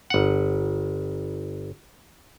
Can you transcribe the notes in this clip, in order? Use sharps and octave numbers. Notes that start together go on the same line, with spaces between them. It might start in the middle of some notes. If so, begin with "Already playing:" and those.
G1 F#5